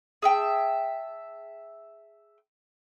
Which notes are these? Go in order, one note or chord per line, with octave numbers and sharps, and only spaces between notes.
G#4 E5 G5 A5